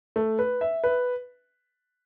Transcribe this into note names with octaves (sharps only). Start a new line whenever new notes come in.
A3
B4
E5
B4